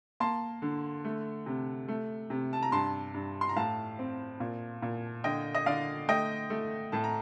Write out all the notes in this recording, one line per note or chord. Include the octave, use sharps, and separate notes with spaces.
A#3 A5 C6
D3
A3
C3
A3
C3
A5
A#5
G2 A5 C6
G2
C6
A#5
A2 F5 A5
C4
A#2
A#2
D3 D#5 G5
D#5
D3 D5 F5
A3 D#5 G5
A3
A2 A5
A#5